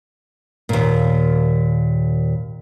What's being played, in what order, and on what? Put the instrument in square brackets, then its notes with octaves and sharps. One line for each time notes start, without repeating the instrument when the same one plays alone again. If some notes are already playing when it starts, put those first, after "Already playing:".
[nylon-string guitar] D#2 A#2